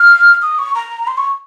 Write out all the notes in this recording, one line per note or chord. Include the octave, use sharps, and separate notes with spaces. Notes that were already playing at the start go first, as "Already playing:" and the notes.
Already playing: F6
D#6
C#6
A#5
C6
C#6